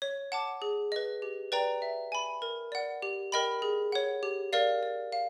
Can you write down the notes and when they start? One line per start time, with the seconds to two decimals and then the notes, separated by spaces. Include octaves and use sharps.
0.02 C#5
0.32 F#5 A5 D6
0.62 G#4
0.92 B4 D#5
1.22 G4
1.52 B4 D5 G5 A#5
1.82 E5
2.12 G#5 B5
2.42 A#4
2.72 D5 F#5
3.02 G4
3.32 A#4 D#5 G5 B5
3.62 G#4
3.92 C#5 F#5
4.23 G4
4.53 A#4 D5 F5
4.83 D5
5.12 F5